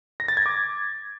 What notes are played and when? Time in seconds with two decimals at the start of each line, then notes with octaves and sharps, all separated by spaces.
0.20 A#6
0.28 A6
0.37 G#6
0.46 D6